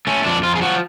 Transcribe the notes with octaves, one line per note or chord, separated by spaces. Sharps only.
A3 C#4
F2 D4
F2 F4
G#4
F3 F#4